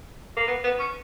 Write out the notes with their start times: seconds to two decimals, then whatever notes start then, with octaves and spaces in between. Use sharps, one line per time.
0.37 A#3
0.48 B3
0.64 B3
0.80 C#4